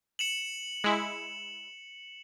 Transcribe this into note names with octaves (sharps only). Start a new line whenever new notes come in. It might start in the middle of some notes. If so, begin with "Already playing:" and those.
C#7 E7 F#7
G#3 E4